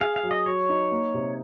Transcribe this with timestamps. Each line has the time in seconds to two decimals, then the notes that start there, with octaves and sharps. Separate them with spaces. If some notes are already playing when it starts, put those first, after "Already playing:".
0.01 G#4 F5
0.16 F5
0.23 F#3
0.31 D#5
0.46 F#3 C#5
0.69 D#4
0.92 A#3
1.14 C3